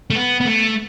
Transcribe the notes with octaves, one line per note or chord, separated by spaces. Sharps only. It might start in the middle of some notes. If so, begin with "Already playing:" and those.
A3
B3
B3
A3